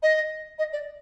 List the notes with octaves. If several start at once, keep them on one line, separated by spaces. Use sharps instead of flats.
D#5
D#5
D5